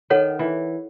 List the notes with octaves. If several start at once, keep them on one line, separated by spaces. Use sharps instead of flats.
D#3 A4 C#5 F#5
E3